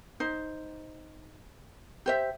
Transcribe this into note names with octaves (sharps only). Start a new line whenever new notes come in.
D#4 C5
G4 C5 E5